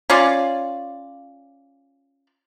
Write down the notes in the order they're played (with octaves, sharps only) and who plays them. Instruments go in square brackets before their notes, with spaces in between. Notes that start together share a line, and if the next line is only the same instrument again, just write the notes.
[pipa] C#4 F4 D5